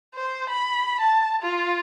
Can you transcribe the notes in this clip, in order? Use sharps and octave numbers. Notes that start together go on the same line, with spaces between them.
C5
B5
A5
F4